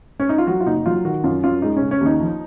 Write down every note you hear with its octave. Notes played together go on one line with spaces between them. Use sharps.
C#4
D#4
F4
F#3 F#4
F4
F#1 D#4
F#3 F4
D#3 F#4
F#2 F4
F#2 F4
G#3 D#4
C#4
C#3
C#4
D#2 D#4
F3